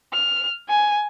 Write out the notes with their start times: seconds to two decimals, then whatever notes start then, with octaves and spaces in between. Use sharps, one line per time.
0.12 F6
0.68 G#5